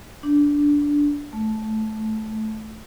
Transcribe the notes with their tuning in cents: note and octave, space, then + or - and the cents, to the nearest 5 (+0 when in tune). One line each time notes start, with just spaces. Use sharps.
D4 -10
A3 -15